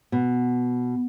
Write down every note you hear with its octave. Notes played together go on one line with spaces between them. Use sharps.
B2